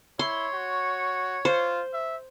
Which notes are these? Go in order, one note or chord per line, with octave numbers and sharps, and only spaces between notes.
E4 C#5 C6
F#4
F4 C5
E5